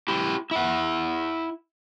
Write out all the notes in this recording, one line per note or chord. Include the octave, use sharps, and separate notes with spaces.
E4 G4
E4 F#5